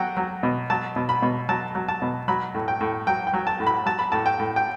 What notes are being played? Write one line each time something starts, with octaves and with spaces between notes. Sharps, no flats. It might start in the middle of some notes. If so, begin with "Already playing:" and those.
Already playing: F#3 F#5 G5
F#3
B2
F#3 A5
B2
B5
B2
F#3 A5
F#3
A5
B2
F#3 B5
A2
G5
A2
F#3 G5
G5
F#3
A5
A2
B5
F#3 A5
B5
A2 A5
G5
A2
G5